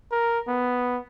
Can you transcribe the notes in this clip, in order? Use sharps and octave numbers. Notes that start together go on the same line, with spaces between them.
A#4
B3